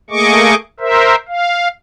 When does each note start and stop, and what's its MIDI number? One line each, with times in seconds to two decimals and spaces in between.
0.10 0.55 57
0.10 0.55 58
0.10 0.55 68
0.10 0.55 75
0.10 0.55 85
0.10 0.55 86
0.80 1.15 70
0.80 1.15 72
0.80 1.15 76
1.28 1.68 77